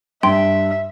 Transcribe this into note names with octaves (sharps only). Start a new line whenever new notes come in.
G2 E5 G5 C6